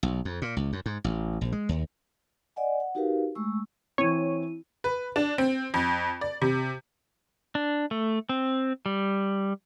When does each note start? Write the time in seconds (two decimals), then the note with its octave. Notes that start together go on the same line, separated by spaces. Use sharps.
0.03 B1
0.25 F2
0.42 A#2
0.57 C#2
0.73 F#2
0.86 G#2
1.04 A1
1.41 A#1
1.52 G#3
1.69 D#2
2.56 D5 D#5 F#5 G#5
2.80 F#5
2.95 D#4 F#4 G4 A#4 B4 F5
3.35 G#3 A3 C#6 E6
3.98 E3 C4 E4 C#5 D#7
4.84 B4
5.16 D4
5.38 C4
5.74 F2
6.21 D5
6.42 C3
7.55 D4
7.91 A3
8.29 C4
8.86 G3